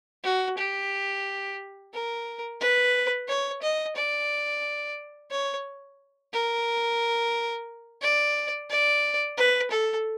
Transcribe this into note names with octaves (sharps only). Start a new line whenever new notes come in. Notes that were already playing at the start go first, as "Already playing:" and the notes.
F#4
G4
A#4
B4
C#5
D#5
D5
C#5
A#4
D5
D5
B4
A4